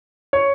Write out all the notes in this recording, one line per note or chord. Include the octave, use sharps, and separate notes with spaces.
C#5